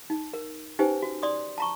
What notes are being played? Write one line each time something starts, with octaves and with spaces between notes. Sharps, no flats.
D#4
A#4
C#4 D#4 G4 B4 C5 G#5
F#4
D5 C6 D#6
A5 A#5 C#6